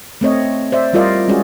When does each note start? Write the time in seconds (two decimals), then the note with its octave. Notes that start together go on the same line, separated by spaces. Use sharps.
0.21 A3 C4 C#5 D#5
0.72 C5 D5 E5
0.93 G3 E4 F4 A#4 D5 D#5
1.28 G3 G#3 C#4 F#4 G#4 D5